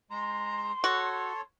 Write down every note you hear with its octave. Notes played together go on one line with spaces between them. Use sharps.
G#3 A#5 C6
F#4 A4 C#5